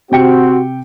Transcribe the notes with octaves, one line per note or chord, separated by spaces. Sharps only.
C3 C4 F#4 G5 C#7